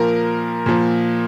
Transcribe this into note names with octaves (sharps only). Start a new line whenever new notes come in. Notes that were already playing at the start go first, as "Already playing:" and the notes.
Already playing: A#2 F3 A#4
A#2 F3